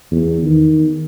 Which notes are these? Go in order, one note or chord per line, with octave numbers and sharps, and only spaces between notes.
E2
D#3